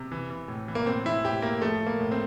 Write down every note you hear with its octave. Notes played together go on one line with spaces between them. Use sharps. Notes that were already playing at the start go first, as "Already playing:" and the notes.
Already playing: C3
E3
E3
A2
E3
A#3
A2 C4
E3 E4
A2 G4
A2 A#3
F3 A3
F3
A#3
A2
C4